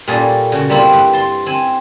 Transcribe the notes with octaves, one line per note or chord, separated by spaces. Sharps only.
A#2 G3 A#3 C#4 G#4 A4
C#3 F#4
G3 A#3 C4 E4 F4
G2 B4
A5 C6
C4 G#5